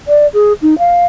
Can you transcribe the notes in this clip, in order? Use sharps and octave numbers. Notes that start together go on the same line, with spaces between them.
D5
G#4
D#4
F5